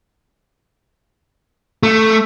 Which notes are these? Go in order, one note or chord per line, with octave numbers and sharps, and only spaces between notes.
A3